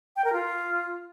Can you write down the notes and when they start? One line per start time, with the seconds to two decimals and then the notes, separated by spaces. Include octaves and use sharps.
0.16 G5
0.25 A#4
0.33 F4